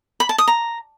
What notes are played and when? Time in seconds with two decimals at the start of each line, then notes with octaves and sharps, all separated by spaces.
0.20 B5
0.29 A5
0.38 D#6
0.48 A#5